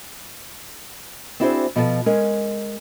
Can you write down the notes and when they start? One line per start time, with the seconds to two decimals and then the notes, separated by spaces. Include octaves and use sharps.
1.40 C4 D4 E4 F#4 G#4 C5
1.76 B2 F3 A4 G5 A5
2.06 G#3 C#4 A#4